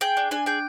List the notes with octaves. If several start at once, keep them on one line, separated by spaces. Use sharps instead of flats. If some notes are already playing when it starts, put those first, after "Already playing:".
G#4 G5
D4
D4 G#5
G#4 G5